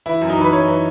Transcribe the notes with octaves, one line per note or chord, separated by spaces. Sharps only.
E3 E4
F#2
D#4
E3 B4
F#2 C#5
E3